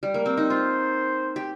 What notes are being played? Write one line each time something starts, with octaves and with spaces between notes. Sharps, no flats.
G3
A#3
C4
D#4
F4 C5
G4